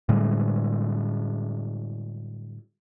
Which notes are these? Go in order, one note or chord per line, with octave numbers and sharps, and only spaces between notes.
A2 D3 G3 G#3